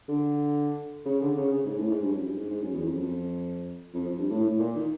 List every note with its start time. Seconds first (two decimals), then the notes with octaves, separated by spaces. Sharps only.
0.09 D3
1.05 C#3
1.21 D3
1.37 C#3
1.53 C#3
1.66 G#2
1.77 A2
1.89 G#2
2.02 G2
2.14 F#2
2.25 G2
2.37 G#2
2.50 G#2
2.62 F#2
2.74 E2
2.86 F2
2.93 F#2
3.01 F2
3.94 F2
4.06 F2
4.18 G2
4.31 A2
4.43 A2
4.58 A#2
4.75 D#3